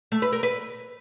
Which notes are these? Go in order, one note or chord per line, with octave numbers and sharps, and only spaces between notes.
A3
B4
A#4
B4